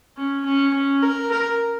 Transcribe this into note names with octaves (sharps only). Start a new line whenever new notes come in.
C#4
C#4
C#4
A#4
A#4